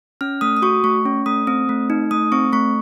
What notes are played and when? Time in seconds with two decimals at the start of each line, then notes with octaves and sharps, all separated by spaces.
0.21 C#4 F6
0.41 A3 D#6
0.57 D#6
0.62 F#4 C#6
0.84 A3 C#6
1.06 C#4
1.26 A3 D#6
1.47 C4 D#6
1.69 A3
1.90 D#4
2.11 A3 D#6
2.32 C4 C#6
2.53 A3 C#6